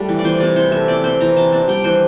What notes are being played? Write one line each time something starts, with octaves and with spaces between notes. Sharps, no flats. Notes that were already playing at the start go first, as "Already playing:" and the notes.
Already playing: G3 A3 D4
E3
D5
E3 C5
C3 D5
E3 C5
A3 E5
C4 D5
C4 C5
E3 A#5
C4 A5
D4 A5
G3 G5
E3 C5